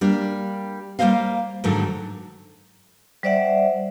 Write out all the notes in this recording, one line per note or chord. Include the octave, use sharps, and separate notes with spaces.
G3 A#3 D4
G3 A#3 C#4 C5 D#5 F5
G#2 D3 D#3 F#3 A3
G3 C5 D5 E5 F#5